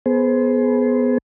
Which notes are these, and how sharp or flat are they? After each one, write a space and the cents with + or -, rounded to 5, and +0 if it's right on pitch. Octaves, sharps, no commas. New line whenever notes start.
B3 +0 G#4 +30 C5 +0